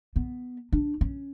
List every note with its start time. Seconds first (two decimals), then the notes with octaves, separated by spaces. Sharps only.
0.16 B3
0.72 D4
1.01 C#4